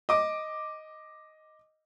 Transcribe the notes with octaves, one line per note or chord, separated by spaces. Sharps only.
D#5 D6